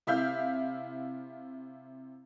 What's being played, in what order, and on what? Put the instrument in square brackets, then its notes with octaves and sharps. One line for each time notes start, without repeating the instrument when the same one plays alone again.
[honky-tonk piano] C3 E4 E5 F5 G6